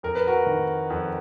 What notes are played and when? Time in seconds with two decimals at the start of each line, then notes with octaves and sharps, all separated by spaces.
0.03 F2 A#4
0.15 B4
0.27 F#4 A#4
0.46 D#3
0.90 F2